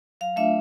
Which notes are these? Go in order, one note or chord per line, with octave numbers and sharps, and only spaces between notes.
F#3 F5
A3 D4 F4 E5